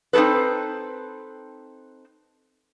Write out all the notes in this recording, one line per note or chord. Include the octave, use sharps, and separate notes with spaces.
C4 D#4 G4 A4 B4